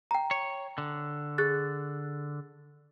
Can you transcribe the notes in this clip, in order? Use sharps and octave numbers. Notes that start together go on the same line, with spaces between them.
G5 A#5
C#5
D3
G#4 F#6 A6